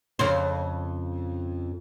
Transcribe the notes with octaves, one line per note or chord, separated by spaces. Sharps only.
F2 C#3 C5